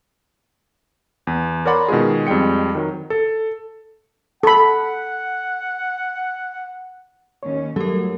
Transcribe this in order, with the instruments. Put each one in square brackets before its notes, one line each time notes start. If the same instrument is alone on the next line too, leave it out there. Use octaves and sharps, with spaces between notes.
[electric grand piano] E2
A#4 C#5 D5 F#5 B5 C6
B2 D#3 G#3 F4 G#4
F2 G3 G#3 G5 C#7
D#3 F#3
A4
[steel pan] A4 B5 [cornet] F#5
[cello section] D#2 C#4 [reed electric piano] C#5
[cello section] G2 A3 [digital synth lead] F#3 [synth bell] G4 A#4 [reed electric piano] A4